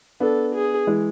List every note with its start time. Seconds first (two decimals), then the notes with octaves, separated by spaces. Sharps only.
0.20 B3 D4 A4
0.54 G#4
0.87 E3 G#3